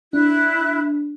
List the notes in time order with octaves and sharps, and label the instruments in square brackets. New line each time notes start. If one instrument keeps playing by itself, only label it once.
[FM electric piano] D4 [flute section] E4 F#6